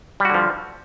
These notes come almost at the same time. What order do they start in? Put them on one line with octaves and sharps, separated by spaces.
G3 F#4 D3 F3